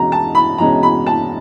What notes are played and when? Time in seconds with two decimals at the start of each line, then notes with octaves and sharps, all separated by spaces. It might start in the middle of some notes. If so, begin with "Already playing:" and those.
Already playing: E2 B2 G#3 C#4 A#5
0.12 A5
0.35 B5
0.58 E2 B2 G#3 C#4 A#5
0.83 B5
1.07 A5